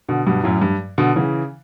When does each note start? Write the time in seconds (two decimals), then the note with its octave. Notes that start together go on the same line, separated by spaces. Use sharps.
0.09 B2 D3
0.26 G2 B2
0.44 F#2 A2
0.62 G2
0.98 B2 D3
1.16 C#3 E3